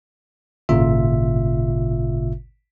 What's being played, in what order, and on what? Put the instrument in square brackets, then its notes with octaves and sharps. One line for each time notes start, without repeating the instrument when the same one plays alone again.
[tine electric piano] G#1 A#2 C#3 F4 E5